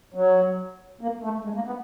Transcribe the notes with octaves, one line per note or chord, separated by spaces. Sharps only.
F#3
A#3
A3
G#3
A#3
B3